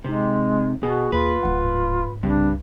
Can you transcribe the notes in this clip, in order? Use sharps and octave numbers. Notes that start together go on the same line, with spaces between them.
C3 G#3 C4 D#4
B2 F#4 G#4
D#2 F4 B4
D1 E4 F#5
G#2
C2 G2 C#3 G3 C4 D4